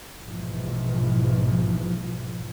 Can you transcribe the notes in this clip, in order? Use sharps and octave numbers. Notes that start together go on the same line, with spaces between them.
A#1 G#2 B2 E3 F3